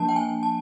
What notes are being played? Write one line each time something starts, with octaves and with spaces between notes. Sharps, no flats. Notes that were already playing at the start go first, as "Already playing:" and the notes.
Already playing: F3 A#3 D4 A5
G5
G#5
A5